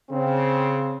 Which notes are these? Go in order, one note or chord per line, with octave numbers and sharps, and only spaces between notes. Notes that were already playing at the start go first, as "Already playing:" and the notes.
C#3 C4